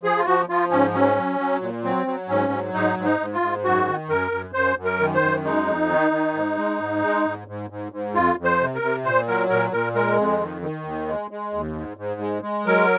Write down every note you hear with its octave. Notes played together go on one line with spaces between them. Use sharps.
F3 G#4
F4
F3 F#4
F3 F4
G#2 C#4
F#3 C#4
F#3
F#3
A#2
F#3 C4
F#3
G#2 C#4
F#3
G#2 D#4
G#2
D#4
G#2
F4
G#2
F#2 F#4
D#3
F#2 A#4
F#2
F#2 C5
F#2
A#4
D#3
C5
F#2
G#3 D#4
F2
D#3
D#3
G#2
G#3
G#2
G#3
G#2
G#2
G#2
G#2
F2 F4
F2
C5
C3
A#4
C3
A#2 C5
F#3 A#4
A#2 A#4
A#2 A#4
G#3 A#4
F2
D#3
D#3
D#2
G#3
G#3
D#2
G#2
G#2
G#3
G#3
F#3 A#4